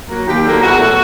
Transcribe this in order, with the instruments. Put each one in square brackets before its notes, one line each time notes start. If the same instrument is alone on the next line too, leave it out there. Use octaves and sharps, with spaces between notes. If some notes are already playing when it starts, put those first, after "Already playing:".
[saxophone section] F#3 A#3
D#2 G4
D3 F#3 A#3
E2 F#4
B2 F#3 A3